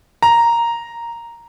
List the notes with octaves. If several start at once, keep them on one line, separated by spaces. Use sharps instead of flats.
A#5